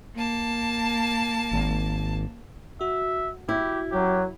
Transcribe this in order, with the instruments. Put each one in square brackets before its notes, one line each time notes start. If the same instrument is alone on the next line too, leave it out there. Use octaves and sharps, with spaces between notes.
[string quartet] A#3 A5
[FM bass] G#1
[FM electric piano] F#4 [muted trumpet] E5
[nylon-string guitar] E4 [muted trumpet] G4
[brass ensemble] F#2 F#3 [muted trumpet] G4